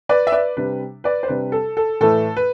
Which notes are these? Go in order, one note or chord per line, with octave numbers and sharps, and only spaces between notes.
B4 D5
E5
B4 D5
C3 G3 D4 B4
B4 D5
C5
C3 G3 D4 B4
A4
A4
A2 E3 A3 A4
B4